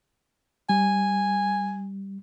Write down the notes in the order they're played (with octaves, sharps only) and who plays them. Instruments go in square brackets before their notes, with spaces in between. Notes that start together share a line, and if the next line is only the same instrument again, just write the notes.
[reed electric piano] G3 [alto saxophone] G#5